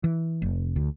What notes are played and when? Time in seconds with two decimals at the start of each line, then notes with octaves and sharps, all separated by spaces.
0.04 E3
0.42 F1
0.76 D2